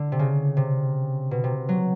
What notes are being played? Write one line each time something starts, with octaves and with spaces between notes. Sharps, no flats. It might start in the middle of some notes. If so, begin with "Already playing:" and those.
Already playing: D3
C3
C#3
C3
B2
C3
F#3